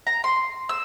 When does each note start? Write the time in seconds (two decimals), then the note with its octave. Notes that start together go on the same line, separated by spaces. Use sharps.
0.07 A#5
0.24 C6
0.69 E6